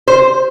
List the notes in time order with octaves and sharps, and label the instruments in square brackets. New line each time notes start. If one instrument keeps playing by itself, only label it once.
[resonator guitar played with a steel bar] C5